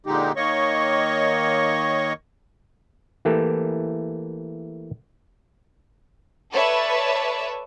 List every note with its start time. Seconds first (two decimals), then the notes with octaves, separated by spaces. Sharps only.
0.06 A#2 D3 G#3 D#4 G4
0.36 D#3 A#3 C#5 D#5 C#6
3.25 E3 A3 A#3 G4 A4
6.52 A4 B4 C#5 D5 E5 A5